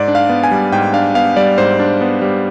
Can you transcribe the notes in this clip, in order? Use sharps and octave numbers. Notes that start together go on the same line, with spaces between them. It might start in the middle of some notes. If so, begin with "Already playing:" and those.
Already playing: G#2 D5
D4
F5
B3
G#5
G3
G#2 G5
D4 F5
B3 F5
G3 D5
G#2 C5
D4
B3
G3